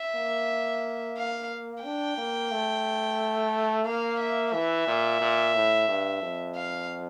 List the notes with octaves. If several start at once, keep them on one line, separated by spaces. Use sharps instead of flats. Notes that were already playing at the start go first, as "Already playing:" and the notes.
Already playing: E5
A#3
F5
D4 G5
A#3
A3
A#3 F5
E5
E3 E5
A#2
A#2
A2
G2
F2
F5